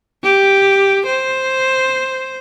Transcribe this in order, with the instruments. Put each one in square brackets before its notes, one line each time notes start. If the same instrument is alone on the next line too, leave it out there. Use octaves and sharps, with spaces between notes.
[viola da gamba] G4
C5